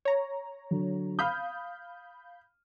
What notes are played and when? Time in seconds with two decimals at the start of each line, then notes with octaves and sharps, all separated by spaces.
0.05 C#5 A#5
0.71 D3 F#3
1.19 F5 B5 D#6 F6 G6